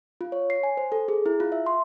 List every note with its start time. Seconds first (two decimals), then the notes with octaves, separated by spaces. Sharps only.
0.21 F4
0.32 C#5
0.50 C7
0.63 G#5
0.77 C5
0.92 A4
1.08 G#4
1.26 E4
1.40 F4
1.52 E5
1.66 C6